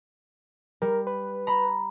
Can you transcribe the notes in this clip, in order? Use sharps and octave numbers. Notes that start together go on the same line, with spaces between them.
G3 A#4
B4
A#5 B5